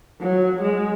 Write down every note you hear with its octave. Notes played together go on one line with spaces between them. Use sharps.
F#3
G#3